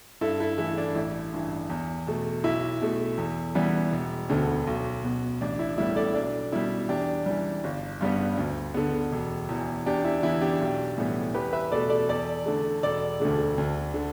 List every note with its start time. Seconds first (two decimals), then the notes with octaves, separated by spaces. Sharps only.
0.21 G2 E4 A4
0.40 E4 A4
0.58 E3 A3 E4
0.77 D4
0.95 A1 E4
1.33 G2 E3
1.70 E2
2.07 B2 A3
2.44 B1 E4
2.81 B2 A3
3.18 E2
3.55 E3 G3 B3
3.93 E1
4.29 D2 D3 B3
4.67 B1
5.04 B2 B3
5.41 A1 D4
5.59 E4
5.78 A2 G3 B3 E4
5.96 A4 D5
6.14 B1 D4
6.52 B2 G3 E4
6.89 E2 D4 G4
7.26 E3 G3
7.64 G1
8.01 G2 G3 B3
8.38 D2
8.74 D3 B3
9.12 E1
9.49 E2 E3
9.86 E2 D4 G4
10.04 E4
10.23 E3 B3 E4
10.41 D4 G4
10.61 B1
10.98 A2 E3 G3 B3
11.34 E2 G4 B4
11.53 B4 E5
11.71 B2 A3 A4 D5
11.90 A4 D5
12.09 E2 A4 D5
12.46 D3 A3
12.83 E1 A4 D5
13.20 D2 D3 A3
13.58 D2
13.94 D3